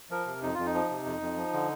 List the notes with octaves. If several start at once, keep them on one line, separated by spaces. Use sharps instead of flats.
F3 A#4
C3
F2 D#4
F2 F4
D#4
F3
C3
F2
F2
F3
D3